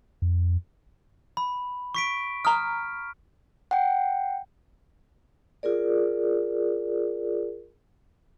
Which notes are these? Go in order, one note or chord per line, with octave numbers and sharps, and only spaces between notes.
F2
B5
C#6 B6 D7
A#5 D#6 F6
F#5 G5
F4 G#4 A#4 D5